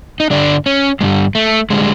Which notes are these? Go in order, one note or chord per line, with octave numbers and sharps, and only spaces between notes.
D#4
G2 D3 G3 D4
C#4
G2 D3 G3 G#3
A3
D3 G3 G#3